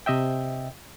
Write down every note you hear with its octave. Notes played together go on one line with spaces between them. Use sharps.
C3 D#5 E5 G5